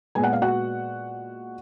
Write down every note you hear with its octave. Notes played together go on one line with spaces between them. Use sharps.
A#2 G#3 B3 G#5
F#5
F5
F#4 F#5